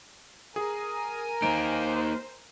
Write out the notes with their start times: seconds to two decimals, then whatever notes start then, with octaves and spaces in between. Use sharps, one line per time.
0.56 G#4 A#4 G#5
1.42 A#3 D#4 C5 D7